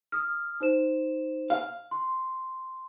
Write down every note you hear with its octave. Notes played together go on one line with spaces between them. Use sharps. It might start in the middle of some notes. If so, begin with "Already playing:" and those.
D#6 F6
D#4 C5 E7
F5
C6